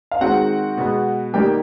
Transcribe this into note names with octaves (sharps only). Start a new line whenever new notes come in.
F5
D#3 G#3 C4 F#4 F#5
B2 G#3 B3
D#3 G3 A#3 G4 G5